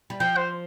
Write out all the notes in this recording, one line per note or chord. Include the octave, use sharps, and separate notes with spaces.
G3
F3 G5
C5